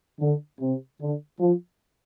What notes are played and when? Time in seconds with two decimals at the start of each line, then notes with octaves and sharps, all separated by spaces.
0.20 D3
0.60 C3
1.00 D3
1.40 F3